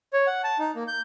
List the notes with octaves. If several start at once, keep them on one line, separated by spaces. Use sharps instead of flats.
C#5
F#5
A5
D#4
A#3
G6